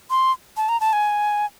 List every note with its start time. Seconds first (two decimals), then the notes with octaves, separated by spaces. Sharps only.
0.10 C6
0.57 A5
0.69 A#5
0.81 A5
0.93 G#5